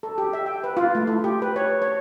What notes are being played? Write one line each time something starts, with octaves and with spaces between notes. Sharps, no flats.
A4
G4
E5
G5
B4
F4
A3
E4
G4
B4
C#5
C#5